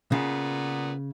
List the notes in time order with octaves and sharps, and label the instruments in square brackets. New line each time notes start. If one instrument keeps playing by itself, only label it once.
[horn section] A#2 B3 [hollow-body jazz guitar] C#3